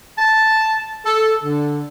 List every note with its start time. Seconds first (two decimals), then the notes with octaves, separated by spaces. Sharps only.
0.18 A5
1.04 A4
1.44 D3